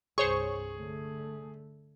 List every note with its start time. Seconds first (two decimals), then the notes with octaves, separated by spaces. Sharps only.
0.18 C2 G2 G#4 C5 C#5 C#6
0.73 D3 A3